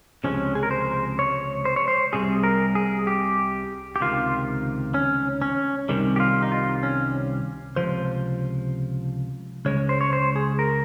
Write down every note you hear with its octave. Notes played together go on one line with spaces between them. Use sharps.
C#2 C3 F3 G#3 C#4
G#4
A#4
C5
C#5
C5
C#5
C5
C2 C3 G3 G#4
A#4
G#4
G4
G4
C#2 C3 D#3 F4
C#4
C#4
C2 C3 D#3 G3
G4
F4
D#4
F4
C#4
C#2 C3 F3 C5
C#2 C#3 G#3 C#5
C5
C#5
C5
G#4
A#4